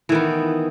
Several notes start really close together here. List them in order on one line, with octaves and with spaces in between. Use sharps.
E3 D#3 B3